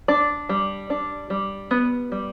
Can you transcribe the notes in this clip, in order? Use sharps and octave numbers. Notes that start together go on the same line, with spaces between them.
D4 D5
G3
D4
G3
B3
G3